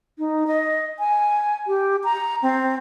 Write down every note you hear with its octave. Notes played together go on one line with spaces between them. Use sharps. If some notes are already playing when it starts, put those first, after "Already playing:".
D#4
D#5
G#5
G4
A#5
C4